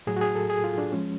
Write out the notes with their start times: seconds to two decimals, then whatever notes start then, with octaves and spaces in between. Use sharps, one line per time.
0.07 A2 F#3 G#4
0.16 F#4
0.21 G#4
0.35 A4
0.50 G#4
0.64 F4
0.78 D4
0.92 F3 G#3 C#4